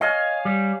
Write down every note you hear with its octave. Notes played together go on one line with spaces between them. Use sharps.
C#5 D#5 F5 G#5
G3